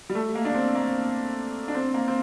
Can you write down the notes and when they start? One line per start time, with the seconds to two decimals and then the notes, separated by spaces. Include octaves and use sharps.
0.09 G3
0.15 A3
0.35 A#3
0.45 D4
0.55 C4
0.75 A#3
1.68 D4
1.75 C4
1.94 A#3
2.08 C4